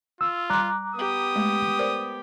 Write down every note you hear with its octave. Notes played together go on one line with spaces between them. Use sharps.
F4 E6
G3 A#5 C6 D6 F#6
B3 G4 D#6
G#3 A3
A#4 C5 D5